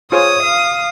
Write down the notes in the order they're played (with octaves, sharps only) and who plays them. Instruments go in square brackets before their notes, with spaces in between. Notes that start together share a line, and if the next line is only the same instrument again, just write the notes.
[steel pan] F4 G#4 C5 [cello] C#5 [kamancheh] D#6
[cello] F5